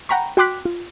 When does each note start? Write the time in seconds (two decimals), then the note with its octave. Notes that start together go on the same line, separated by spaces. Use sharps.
0.09 F#5 G5 A#5 B5 C#6
0.37 F#4 G5 C6 D6 F#6 B6
0.65 F4